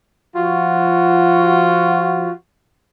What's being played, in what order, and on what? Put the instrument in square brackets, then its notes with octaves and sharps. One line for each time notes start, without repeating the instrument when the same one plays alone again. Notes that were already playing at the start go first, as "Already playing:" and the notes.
[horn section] F3 F4 F#4